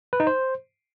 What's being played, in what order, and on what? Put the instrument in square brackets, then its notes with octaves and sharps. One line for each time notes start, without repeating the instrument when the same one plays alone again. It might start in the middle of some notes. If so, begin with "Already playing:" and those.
[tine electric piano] B4
D#4
C5